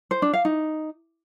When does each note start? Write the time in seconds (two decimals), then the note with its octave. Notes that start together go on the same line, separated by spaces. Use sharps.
0.11 C5
0.22 D4
0.33 F5
0.45 D#4